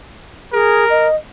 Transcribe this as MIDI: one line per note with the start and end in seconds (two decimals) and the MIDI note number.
0.53 0.85 68
0.53 1.08 70
0.90 1.15 75